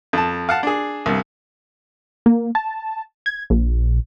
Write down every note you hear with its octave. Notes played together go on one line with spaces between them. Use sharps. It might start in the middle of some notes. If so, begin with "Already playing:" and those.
F2 A5
F5 F#5 A5
D4 G#4
C2 G2 C3
A#3
A5
G#6
A#1